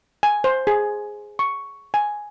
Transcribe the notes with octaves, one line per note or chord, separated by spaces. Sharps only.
G#5
C5
G#4
C#6
G#5